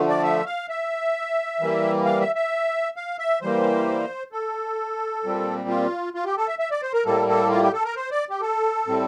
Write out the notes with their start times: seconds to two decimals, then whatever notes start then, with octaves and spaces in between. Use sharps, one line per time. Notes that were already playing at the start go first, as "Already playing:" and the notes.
Already playing: D3 F3 A3
0.09 D5
0.24 E5
0.46 F5
0.69 E5
1.60 E3 G3 A#3
2.05 F5
2.20 E5
2.35 E5
2.96 F5
3.19 E5
3.42 E3 G3 A#3 C5
4.32 A4
5.23 A#2 G3 C4
5.69 F4
6.15 F4
6.25 G4
6.37 A4
6.48 E5
6.59 E5
6.71 D5
6.82 C5
6.94 A#4
7.05 A2 G3 A#3 A4
7.28 A4
7.50 F4
7.62 G4
7.73 A4
7.85 A#4
7.96 C5
8.11 D5
8.30 G4
8.41 A4
8.87 A2 G3 C4